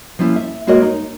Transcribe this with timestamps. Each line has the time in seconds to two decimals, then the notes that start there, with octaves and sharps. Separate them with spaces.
0.19 F3 A#3 C#4 E4
0.36 E5
0.67 G#3 A#3 F#4 A#4 C#5 D#5
0.82 D#4